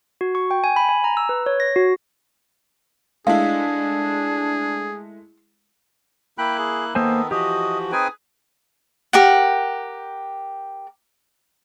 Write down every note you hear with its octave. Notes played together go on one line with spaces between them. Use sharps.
F#4
C#6
G5
G#5
B5
G#5
A#5
E6
B4
C#5
A#6
F#4
G#3 A3 D4 E4 G#4 F5
A#3 E4 G5 B5 F#6
G#4
D#3 A#3 B3 A4 C5 D#5 G#5
E3 F3 F#4 G4 D#5
C4 D#4 G#4 B4 G5 G#5
G4 A#4 F#5